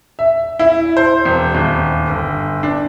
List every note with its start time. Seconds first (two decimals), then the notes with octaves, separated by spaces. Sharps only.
0.19 E5
0.59 E4
0.97 C5
1.25 E1
1.55 D#1
2.07 G1
2.63 D4